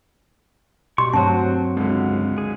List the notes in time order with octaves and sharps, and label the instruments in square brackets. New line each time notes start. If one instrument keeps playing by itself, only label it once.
[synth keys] B2 [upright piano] G3 [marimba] C6 [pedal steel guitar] C#6
[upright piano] D2 C5 [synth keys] G2 F#3 [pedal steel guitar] C4 F#4 [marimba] A5
[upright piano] C#2 D3
[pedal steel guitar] G#4